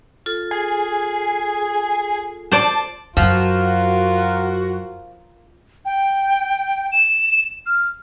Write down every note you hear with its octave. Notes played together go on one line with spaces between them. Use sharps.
F4 A4
G#4
C5 D5 A5
F#2 F3 F4 F#4 A#4
G5
E7
F6